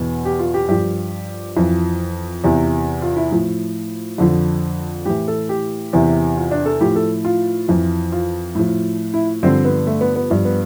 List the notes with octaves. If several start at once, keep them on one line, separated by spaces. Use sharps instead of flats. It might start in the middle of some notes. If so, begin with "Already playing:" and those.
Already playing: E2 B2
G4
F4
G4
G2 F3 G4
F2 E3 F4
E2 C3 E3
F4
E4
A2 F3
F2 D3 F3
A2 E3 G4
A4
G4
E2 C3 E3
F4
D4
A4
A2 F3 G4
A4
F4
F2 E3
F4
A2 F3
E4
G2 D3 F3 C4
B3
A3
B3
B3
G2 F3
B3